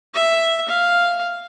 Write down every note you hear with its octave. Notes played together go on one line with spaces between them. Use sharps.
E5
F5